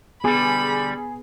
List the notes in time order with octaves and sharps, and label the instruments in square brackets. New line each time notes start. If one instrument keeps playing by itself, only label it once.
[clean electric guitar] D3 G3 [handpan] B3 [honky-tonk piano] G#4 [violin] B5